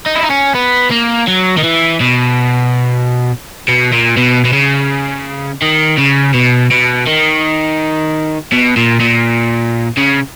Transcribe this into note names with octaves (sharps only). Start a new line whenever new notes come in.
D#4
E4
D#4
C#4
B3
A#3
F#3
D#3
E3
B2
B2
A#2
B2
B2
C#3
D#3
C#3
B2
B2
D#3
B2
A#2
A#2
C#3